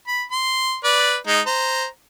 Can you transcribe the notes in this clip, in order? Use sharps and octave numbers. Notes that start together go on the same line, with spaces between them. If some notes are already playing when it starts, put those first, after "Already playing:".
B5
C6
B4 D5
G#3 D#4
C5 A#5